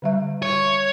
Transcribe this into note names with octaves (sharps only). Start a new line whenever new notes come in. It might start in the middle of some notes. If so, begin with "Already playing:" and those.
D3 G3 E5
C#5